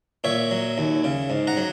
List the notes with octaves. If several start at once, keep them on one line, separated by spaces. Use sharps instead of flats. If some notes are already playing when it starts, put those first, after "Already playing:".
A#2 C#5 E5
F#3
D#2
C#3
G#2
F#5 A#5
F#3